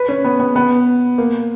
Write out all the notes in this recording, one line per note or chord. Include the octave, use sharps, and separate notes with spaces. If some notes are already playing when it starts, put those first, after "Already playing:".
Already playing: B4
C#4
B3
B3
B3
A#3